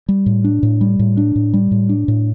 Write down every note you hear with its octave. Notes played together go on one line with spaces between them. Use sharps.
G3
A2
D4
A2
G3
A2
D4
A2
G3
A2
D4
A2